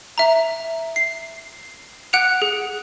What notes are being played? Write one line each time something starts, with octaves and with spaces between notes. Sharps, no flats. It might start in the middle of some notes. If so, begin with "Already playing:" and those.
E5 A#5
C7
F#5 F#6 C#7 D7 F7
G#4